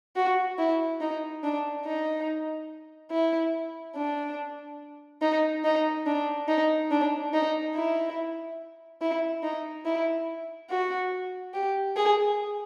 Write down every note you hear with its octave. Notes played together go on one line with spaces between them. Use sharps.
F#4
E4
D#4
D4
D#4
E4
D4
D#4
D#4
D4
D#4
D4
D#4
E4
E4
D#4
E4
F#4
G4
G#4